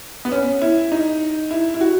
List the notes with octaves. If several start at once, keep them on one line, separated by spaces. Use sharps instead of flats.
B3
C#4
E4
D#4
E4
E4
F#4